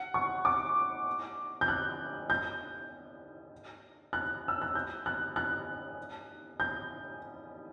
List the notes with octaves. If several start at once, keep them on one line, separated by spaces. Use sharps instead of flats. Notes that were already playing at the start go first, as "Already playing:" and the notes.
Already playing: F#5
C#6
D6
G6
F#6
G6
F#6
E6
F#6
G6
F#6
F#6
G6